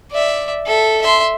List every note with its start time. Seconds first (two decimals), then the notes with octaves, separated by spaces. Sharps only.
0.12 D5 E5
0.66 A4 E5
1.02 E5 C6